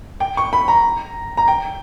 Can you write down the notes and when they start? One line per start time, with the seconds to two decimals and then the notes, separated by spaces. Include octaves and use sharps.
0.20 G5
0.37 C#6
0.53 B5
0.68 A#5
1.37 A#5
1.48 G5